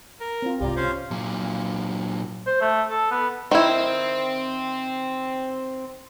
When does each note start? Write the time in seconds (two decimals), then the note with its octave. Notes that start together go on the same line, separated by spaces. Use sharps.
0.20 A#4
0.42 C4 F4
0.60 C2 G#2 F4 G4 D5 A#5
0.76 C#4 F4 C5 F5
1.11 A#2 F#3
2.47 C5
2.61 A3
2.89 A4
3.11 B3
3.51 D#3 C4 E4